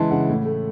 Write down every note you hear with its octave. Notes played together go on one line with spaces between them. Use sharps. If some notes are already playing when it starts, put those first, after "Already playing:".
Already playing: C#3 E3 G#3 A5 C6
C#3 F#5
A2
A3